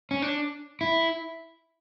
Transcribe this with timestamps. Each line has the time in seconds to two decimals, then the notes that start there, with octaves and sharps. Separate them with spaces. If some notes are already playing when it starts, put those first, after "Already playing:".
0.11 C#4
0.22 D4
0.81 E4